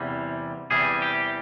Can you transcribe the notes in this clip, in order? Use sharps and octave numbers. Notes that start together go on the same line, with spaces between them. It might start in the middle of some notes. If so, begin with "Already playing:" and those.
Already playing: E2 C3 E3 G3
E2 C3 E3 G3 G#4
G4